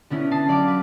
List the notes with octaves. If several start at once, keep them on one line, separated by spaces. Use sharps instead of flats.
D3 B3 C#4 E4
A5 D#6 C7
F#3 D5 F5 D6 D7
B4